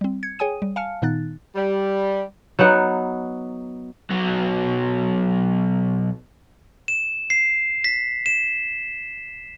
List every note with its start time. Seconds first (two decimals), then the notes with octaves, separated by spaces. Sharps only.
0.01 G3 C4
0.23 G#6 C#7
0.39 G#4 C#5 G5 G#5 D#6 D#7
0.62 G3
0.76 F5 G#5 A5 F6 C#7
1.02 A#2 D#3 B3 D#4 F#6 A6
1.56 G3
2.59 F#3 B3 D#4 F#5
4.10 B1 F#3
6.88 E7
7.30 C7
7.84 B6
8.26 E7